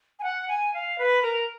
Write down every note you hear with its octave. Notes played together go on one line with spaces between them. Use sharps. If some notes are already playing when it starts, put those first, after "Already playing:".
G#5
F#5
G#5
F5
B4
A#4